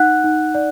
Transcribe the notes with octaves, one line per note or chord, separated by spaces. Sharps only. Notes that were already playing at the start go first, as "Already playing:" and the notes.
Already playing: D#4 F#5 F#6
D#4
D5